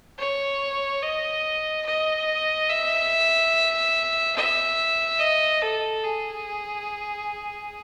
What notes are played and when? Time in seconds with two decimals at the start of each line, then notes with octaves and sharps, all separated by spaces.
0.19 C#5
1.03 D#5
1.86 D#5
2.69 E5
4.36 E5
5.20 D#5
5.62 A4
6.04 G#4